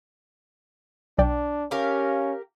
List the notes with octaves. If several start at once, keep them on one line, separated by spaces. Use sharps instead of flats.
B1 D4 D5 G5
C#4 G4 A#4 F5